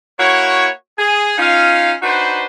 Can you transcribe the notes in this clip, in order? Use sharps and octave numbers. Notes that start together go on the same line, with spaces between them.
A#3 E4 F#4 C#5
G#4
C#4 D#4 F4 F5
D4 D#4 F#4 B4 C5